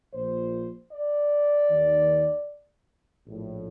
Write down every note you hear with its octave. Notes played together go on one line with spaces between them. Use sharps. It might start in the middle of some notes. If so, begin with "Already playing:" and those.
A#1 A#2 C5
D5
D#2 D#3
A#1 A2